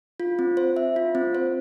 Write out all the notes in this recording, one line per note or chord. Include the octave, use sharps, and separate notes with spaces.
F4
C4
C5
E5
F4
C4
C5